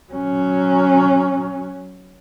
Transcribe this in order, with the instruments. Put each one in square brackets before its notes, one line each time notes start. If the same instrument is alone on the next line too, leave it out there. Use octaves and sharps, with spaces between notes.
[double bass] F#3 C#4